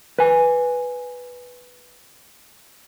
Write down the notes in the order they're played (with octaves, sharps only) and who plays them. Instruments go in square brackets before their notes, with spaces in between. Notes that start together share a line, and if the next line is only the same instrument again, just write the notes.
[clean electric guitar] B4 G#5